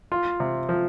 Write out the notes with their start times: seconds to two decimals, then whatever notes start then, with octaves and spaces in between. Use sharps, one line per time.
0.12 F4
0.40 C3
0.69 F3